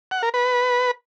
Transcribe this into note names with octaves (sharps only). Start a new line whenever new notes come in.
F#5
A#4
B4